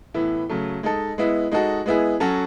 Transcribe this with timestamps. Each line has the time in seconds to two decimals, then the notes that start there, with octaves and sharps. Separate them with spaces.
0.14 A2 E3 B3 E4
0.49 C#3 F#3 A3
0.83 G#3 D#4 A4
1.18 G#3 B3 E4
1.52 G#3 D#4 F#4 A4
1.86 G#3 B3 E4 G#4
2.20 F#3 C#4 F#4 A4